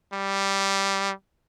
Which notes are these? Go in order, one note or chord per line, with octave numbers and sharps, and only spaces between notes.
G3